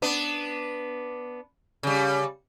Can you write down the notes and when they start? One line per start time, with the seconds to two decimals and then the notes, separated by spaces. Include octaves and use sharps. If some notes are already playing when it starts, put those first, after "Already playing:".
0.02 B3 D4
1.83 C#3 G3